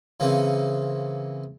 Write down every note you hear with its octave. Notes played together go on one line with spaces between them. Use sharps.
C#3 E3 A#3 C4